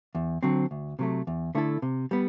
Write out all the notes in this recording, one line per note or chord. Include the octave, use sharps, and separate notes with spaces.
E2
D3 F#3 C4
D2
C3 F#3 A3
E2
D3 A3 E4 A4
C3
G3 B3